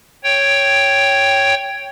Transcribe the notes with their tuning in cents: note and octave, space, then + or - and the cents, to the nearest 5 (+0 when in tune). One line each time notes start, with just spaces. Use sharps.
C#5 +0 G5 +0